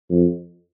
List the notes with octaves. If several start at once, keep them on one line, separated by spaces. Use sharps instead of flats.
F2